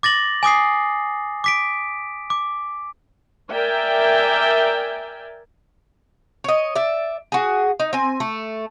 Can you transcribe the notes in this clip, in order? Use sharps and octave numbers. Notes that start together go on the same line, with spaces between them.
D6 A6 A#6 F#7
G#5 D6 D#6 C7
D6 B6 D7
D6
A#4 D5 E5 G5 G#5
C#5 D#5
D5 E5
F#4 G#4
D#4
C4 G#5
A3